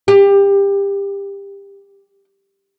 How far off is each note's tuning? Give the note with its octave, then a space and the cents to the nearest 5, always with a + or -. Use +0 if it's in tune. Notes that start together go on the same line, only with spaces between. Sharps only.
G4 +25